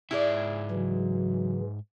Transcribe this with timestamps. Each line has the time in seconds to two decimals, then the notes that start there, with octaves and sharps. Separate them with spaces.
0.11 G#2 E4 G#4 D5 E5
0.71 C#3 E3 F#3